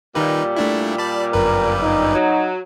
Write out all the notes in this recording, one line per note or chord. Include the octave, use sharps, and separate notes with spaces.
A#2 D#3 G3 D#4 B4
A3 D4 E4
D5 A5 B5
G1 F#2 A#4 B4
D#4
F#3